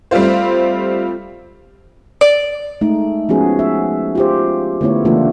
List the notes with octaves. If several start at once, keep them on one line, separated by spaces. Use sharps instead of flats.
G3 A3 C4 F4 C5
D5
G#3 A3 D#4
F3 G#3 B3 C#4 F#4 G#4
E5
F4 G4 C5
D3 A3 B3 E4 C#5
C#3 E3 A3 A#3 D4 F4